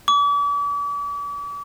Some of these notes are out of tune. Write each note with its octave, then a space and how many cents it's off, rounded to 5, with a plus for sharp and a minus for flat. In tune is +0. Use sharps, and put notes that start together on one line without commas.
D6 -40